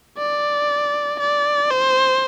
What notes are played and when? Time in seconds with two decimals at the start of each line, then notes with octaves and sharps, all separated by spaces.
0.18 D5
1.20 D5
1.71 C5